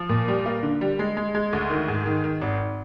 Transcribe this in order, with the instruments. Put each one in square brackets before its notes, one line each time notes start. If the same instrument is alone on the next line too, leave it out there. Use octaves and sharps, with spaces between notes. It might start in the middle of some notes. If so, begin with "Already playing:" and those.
Already playing: [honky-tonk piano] F3
A#2
G3
A#3
D3
G3
G#3
G#3
G#3
D2
D#3
G#2
D#3
D#3
G#1